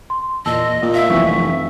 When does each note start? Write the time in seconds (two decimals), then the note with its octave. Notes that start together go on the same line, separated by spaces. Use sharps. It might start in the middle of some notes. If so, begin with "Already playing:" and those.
0.10 C6
0.46 E2 A#2 D#5 A5 E6
0.83 A#2 D#5
0.94 E5 F5 E6
1.10 F1 F#2 E3 C#6